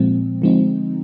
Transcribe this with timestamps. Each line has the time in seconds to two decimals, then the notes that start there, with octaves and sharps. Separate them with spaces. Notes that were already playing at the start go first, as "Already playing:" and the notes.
Already playing: A#2 F3 G#3 C4
0.42 D3 F3 G#3 C4 D#4